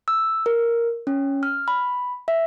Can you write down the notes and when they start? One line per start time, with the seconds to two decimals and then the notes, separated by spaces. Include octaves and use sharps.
0.08 E6
0.46 A#4
1.07 C#4
1.43 F6
1.68 B5
2.28 E5